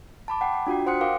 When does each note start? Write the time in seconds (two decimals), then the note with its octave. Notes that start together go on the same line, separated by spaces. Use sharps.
0.28 A5 B5 D6
0.41 F#5 G5 D6
0.54 G5
0.67 D4 F4 F#4 G5
0.86 C5 F#5 C6 D#6 F#6 C#7
1.01 A#4 F5 G5 D6 D7